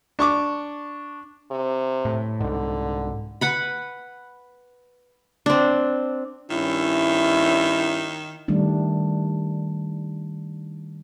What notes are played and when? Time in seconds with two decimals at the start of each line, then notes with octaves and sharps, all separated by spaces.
0.19 D4 C#6 D6
1.51 C3
2.05 A2
2.41 C2 G#2 D3
3.41 B4 F#5 B5
5.46 C4 D4
6.50 G2 D#3 C#4 E4
8.48 D#3 G3 A3 D4